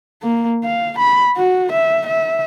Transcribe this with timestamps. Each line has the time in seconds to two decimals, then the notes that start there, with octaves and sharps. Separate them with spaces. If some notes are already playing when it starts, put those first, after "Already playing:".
0.22 A#3
0.64 F5
0.98 B5
1.37 F#4
1.72 E5
2.06 E5